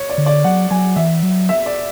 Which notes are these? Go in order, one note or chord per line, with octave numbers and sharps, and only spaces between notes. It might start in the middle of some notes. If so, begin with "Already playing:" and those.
Already playing: C#5
D5
D3
D5
F#3 F#5
F#3 G#5
E3 E5
F#3
E5
D5